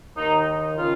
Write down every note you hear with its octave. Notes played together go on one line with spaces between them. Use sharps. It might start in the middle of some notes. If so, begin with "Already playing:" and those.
D#2 D#3 D#4
C#3 F4